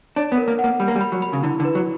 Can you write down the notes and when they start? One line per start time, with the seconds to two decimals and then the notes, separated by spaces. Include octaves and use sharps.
0.16 D4 C#5
0.32 B3
0.38 A#4
0.48 A#3
0.59 F#5
0.64 A#3
0.80 G3 B5
0.88 A#3
0.96 G3
1.01 B5
1.12 F#3
1.22 B5
1.33 C#3
1.43 D3 E4
1.60 D3
1.65 B4
1.75 F#3